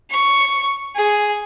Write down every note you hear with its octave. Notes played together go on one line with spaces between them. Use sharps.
C#6
G#4